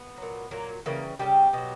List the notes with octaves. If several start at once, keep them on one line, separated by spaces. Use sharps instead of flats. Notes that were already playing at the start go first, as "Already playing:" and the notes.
Already playing: B3
A#2 F#3
A#2 F#3 A#3
C#3 E3 G3 A#3
C#3 E3 G3 G4
B2 F#3